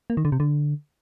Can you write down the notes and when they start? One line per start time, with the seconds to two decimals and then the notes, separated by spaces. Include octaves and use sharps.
0.10 A#3
0.17 D#3
0.25 D3
0.32 C3
0.40 D3